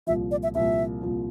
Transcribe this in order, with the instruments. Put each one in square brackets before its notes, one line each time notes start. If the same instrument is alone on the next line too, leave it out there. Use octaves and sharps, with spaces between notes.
[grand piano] C2 A#2 F3 [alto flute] E5
[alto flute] D5
E5
[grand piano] C2 A#2 F3 [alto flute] E5
[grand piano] C2 A#2 F3